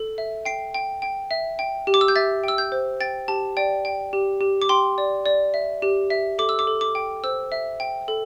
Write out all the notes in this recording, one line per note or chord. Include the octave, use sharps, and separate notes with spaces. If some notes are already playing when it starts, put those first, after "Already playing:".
Already playing: A4
E5
G5 C7
G5
G5
E5
G5
G4
D6
E6
G6
E5 A6
G5 E6
G6
C5
G5 A6
G4 A5
D5 G5
G5
G4
G4
D6
G5 C6
D5
D5
E5
G4
E5
A4 D6
E6
D6
A4
D6
G5
C5 E6
E5
G5
A4